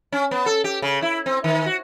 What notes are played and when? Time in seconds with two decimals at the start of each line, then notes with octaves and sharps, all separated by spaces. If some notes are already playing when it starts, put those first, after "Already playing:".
0.12 C#4
0.31 B3
0.46 A4
0.64 G4
0.82 C#3
1.02 E4
1.26 C4
1.44 D#3
1.66 F#4